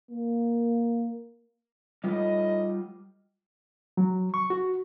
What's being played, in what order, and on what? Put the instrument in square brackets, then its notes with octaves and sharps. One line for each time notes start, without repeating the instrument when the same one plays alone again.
[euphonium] A#3
[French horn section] A2 D#4 D#5 [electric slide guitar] G3 F4
[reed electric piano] F#3
C#6
F#4